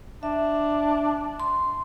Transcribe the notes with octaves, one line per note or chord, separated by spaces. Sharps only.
D4 E5
C6